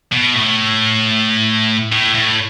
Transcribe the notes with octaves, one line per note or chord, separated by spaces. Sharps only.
B2
A2
A2
A2